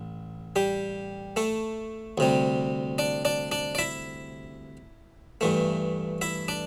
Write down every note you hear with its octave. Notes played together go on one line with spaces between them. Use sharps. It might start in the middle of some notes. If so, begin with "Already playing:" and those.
Already playing: A1
G3 G4
A3 A4
D2 C3 G3
D4 D5
D4 D5
D4 D5
D5
E4 E5
G2 E3 A3
E4 E5
D4 D5